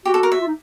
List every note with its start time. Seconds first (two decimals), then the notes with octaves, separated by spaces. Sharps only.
0.05 F#4 G4
0.14 A4
0.23 A#4
0.32 E5
0.41 F4
0.47 D#4